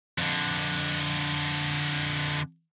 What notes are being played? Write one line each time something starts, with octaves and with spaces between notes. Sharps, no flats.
F2 D3